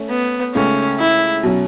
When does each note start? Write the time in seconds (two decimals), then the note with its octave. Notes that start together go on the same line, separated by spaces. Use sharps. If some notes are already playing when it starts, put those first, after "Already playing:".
Already playing: A3 C#4
0.10 B3
0.54 C#2 C#3 A3 C#4
0.99 E4
1.43 B2 F#3 C#4